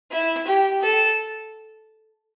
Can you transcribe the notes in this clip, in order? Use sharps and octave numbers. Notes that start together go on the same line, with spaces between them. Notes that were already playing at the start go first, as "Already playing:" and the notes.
E4
G4
A4